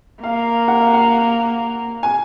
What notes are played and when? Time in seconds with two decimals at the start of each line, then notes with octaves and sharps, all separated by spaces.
0.23 A#3 F5
0.68 F#5
0.81 F5
0.93 F#5
2.03 G#5